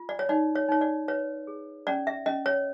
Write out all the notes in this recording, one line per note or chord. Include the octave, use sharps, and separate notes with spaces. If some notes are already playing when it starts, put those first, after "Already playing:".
Already playing: F4
D5
C#5
D#4 D5
C#5
D#4 C#5
D5
B4 C#5
G#4
C#4 D5
E5
C#4 D#5
C#5